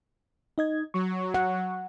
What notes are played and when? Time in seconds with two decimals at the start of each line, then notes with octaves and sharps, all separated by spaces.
0.58 D#4 D#5 G#6
0.94 F#3 C#6
1.34 F#5